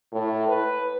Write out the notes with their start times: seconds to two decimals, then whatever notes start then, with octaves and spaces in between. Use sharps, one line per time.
0.12 A2
0.49 B4